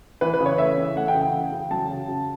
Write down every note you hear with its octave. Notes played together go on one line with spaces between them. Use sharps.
E3 B4
B4
C#3
C#5
A3 E5
E3
A3 F#5
G5
C#3
G5
E3
C#3
F#3 A5
C#3
C#3